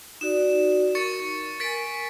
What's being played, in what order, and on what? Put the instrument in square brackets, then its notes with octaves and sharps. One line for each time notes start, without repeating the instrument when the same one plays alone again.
[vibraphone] D#4 F#4 D5 [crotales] E7
[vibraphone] A#4 [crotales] C#6 A6 C#7
[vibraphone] A#4 G#5 [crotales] A6 B6 D7